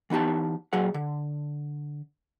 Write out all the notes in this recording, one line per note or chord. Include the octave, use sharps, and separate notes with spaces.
E3 B3 D#4 G4 A5
A#2 F#3 G#4 F#5
D3